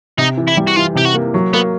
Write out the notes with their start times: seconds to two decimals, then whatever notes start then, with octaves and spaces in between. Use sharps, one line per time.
0.18 C3 D#4
0.37 E3
0.48 E4
0.57 G3
0.67 F#4
0.76 E3 F4
0.95 C3 G4
1.05 F#4
1.14 A#3
1.34 F#3
1.53 A#3 B3